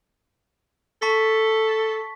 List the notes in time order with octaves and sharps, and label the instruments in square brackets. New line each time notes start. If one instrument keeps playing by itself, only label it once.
[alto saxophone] A4 [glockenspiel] A5 C#6 B6